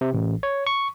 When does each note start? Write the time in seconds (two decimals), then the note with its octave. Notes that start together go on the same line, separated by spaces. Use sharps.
0.01 C3
0.14 A1
0.43 C#5
0.67 C#6